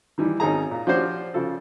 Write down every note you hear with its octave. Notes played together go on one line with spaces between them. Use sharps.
D#3 E3 G3
G#1 C#4 D#4 G#4 A#5
A#2
F3 C#4 D4 F#4 G4 C5
C#3 F3 F4 A4